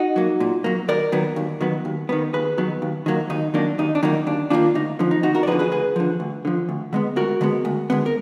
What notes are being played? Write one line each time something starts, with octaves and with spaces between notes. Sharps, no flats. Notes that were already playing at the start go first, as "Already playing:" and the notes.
Already playing: D#4 F#4
F#3 A#3
A#2
F#3 A#3
D#2 A#4 D5
D#3 F#3 B3
D#2
D#3 F#3 B3
D#2
D#3 F#3 B3
D#2 G#4 B4
D#3 F#3 B3
D#2
D#3 F#3 A#3
D#2 D#4
D#3 F#3 A#3 D4
D#2 D#4
D4
D#3 F#3 A#3 D#4
D#2 D4
D#3 F#3 A#3 D4 F4
D2 D#4
D3 F3
D#4
D2 D#4 F#4
F#4 A#4
D5
D3 F3 G#4 B4
G#4 B4
D2 G#4 B4
D3 F3
D2
D3 F3
D2
D3 G#3 B3
D2 F#4 A#4
D3 G#3 B3
D2
D3 G#3 B3
A#4